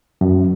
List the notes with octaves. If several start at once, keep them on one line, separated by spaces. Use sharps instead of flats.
F#2